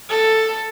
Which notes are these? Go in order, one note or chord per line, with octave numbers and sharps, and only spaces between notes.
A4